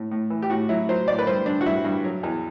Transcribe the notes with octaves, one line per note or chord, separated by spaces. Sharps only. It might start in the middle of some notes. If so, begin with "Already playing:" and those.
Already playing: A2
A2
E3
G4
A2 F#4
F#3 E4
F#3 C5
A2 D5
B4
G2 C5
G2 D4
F#4
G2 E4
G2
F#3
E2